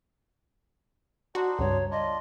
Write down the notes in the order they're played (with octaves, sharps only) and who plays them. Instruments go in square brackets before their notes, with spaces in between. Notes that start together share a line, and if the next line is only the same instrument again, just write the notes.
[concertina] D4 D#4 C5 [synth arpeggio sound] F#4
[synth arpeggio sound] C#2 G2 [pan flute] C#5
[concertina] D4 F4 [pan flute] D#5